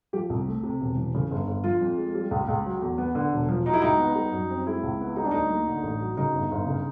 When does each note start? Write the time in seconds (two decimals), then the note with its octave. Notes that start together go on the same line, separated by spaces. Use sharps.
0.13 F3 G4
0.30 C2
0.47 A3
0.63 C3
0.81 E1
0.97 E3
1.14 C#3
1.31 G1
1.47 G1
1.64 F3 F4
1.81 F2
1.98 G#3
2.15 G3
2.31 C#2
2.48 C#2
2.65 F#3
2.81 E2
2.98 B3
3.15 D3
3.33 E1
3.48 F3
3.65 F#3 D#4
3.73 E4
3.82 C#2 D#4
3.99 B3
4.15 G3
4.32 F#2
4.50 C4
4.66 G#3 E4
4.83 C#2
5.00 B3
5.16 G3 D#4
5.24 D4
5.31 D2 D#4
5.50 A#3
5.67 D3
5.83 A1
6.00 F#3
6.17 C#3 D#4
6.34 G1
6.51 G1
6.67 C#3